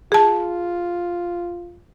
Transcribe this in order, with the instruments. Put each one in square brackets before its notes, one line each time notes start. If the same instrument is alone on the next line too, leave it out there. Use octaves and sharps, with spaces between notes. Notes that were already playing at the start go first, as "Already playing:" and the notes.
[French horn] F4 [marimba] G#4 A5